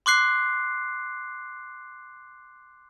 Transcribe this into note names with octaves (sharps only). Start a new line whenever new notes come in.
C6 D6 F#6 C7